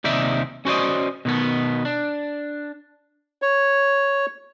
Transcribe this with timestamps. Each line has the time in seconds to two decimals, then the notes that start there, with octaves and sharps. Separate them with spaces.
0.04 D#2 C3 D#4 D5 E5
0.65 C#4 F#4 C5 D5 D#5
1.25 B2 D#3 B3
1.85 D4
3.42 C#5